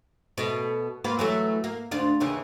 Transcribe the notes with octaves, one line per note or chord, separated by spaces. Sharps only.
B2 A3
A#3 F4 B4
E3 F#3 A3
A#3
D2 D4 F4
D#2 C#3 E3